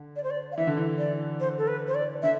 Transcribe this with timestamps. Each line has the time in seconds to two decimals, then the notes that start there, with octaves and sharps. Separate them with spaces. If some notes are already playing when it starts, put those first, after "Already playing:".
Already playing: D3
0.16 D5
0.24 C5
0.30 D5
0.52 F5
0.57 E3 E5
0.67 D3
0.77 E3
0.98 D5
1.40 C5
1.58 A4
1.68 B4
1.88 C5
1.95 D5
2.22 D3 E5